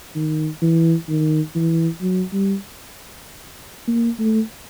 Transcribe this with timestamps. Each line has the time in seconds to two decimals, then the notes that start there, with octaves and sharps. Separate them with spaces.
0.16 D#3
0.62 E3
1.09 D#3
1.55 E3
2.01 F#3
2.33 G3
3.88 A#3
4.19 A3